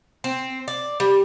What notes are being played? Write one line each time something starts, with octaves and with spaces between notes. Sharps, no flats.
C4
D5
G3